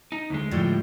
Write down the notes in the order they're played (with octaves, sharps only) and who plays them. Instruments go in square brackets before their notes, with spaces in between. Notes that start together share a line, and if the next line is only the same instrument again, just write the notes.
[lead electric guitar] D#4
D2 G#3
[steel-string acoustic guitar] A2 F3 G3